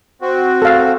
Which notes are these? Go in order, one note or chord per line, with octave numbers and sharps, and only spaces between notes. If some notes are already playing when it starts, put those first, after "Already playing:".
C4 F#4
A4 F5